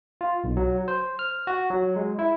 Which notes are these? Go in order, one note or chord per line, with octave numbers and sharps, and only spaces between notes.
F4
B1
F#3
C5
F6
F#4
F#3
G#3
E4